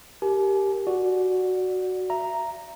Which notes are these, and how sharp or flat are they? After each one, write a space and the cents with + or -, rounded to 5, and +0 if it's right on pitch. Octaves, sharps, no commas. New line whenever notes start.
G4 +0 A#4 +0 G#5 +40
F#4 +0 D5 +0
E5 +30 A#5 +0